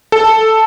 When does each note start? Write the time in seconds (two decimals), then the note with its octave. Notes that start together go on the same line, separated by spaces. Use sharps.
0.12 A4